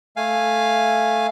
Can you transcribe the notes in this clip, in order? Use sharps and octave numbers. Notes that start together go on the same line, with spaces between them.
A3 F5 G#5